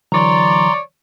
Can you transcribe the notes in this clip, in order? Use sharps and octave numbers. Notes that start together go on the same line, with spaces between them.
D3 E3 F#3 C#5 D5 A#5 C6